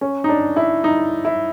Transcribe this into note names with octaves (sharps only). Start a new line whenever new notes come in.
C#4
D#4
D4
E4
D#4
E4